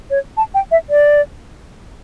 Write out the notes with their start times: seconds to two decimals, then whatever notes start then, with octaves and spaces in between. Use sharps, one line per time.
0.10 C#5
0.37 A5
0.54 G5
0.71 E5
0.90 D5